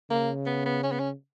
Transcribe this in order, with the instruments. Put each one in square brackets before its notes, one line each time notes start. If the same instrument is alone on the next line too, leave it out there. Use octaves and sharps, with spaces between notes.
[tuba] C#3 [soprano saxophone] A#3
[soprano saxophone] B3
B3
C#4
B3
C#4